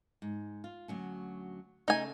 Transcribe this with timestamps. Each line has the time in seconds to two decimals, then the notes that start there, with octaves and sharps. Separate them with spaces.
0.22 G#2
0.64 F4
0.88 D2 F#3 C#4
1.88 C#3 A3 D#4 G#5